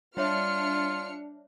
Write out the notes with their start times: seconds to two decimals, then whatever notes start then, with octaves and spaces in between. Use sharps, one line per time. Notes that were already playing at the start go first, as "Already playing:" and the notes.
0.17 G3 D4 F4 C#5 E5 F6 C#7